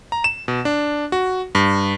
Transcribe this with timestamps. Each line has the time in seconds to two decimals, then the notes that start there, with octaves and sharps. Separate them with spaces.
0.12 A#5
0.24 E7
0.48 B2
0.65 D4
1.12 F#4
1.55 G2